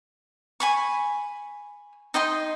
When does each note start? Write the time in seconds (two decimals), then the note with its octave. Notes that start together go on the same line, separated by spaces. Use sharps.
0.60 G#5 B5 C#6
2.14 D#4 D#5 G5 C6